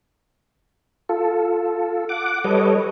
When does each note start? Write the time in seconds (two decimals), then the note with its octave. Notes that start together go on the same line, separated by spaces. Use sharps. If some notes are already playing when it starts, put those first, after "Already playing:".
1.09 F4 A4
2.09 F#5 D6
2.44 G3 A4 B4 C#5 D#5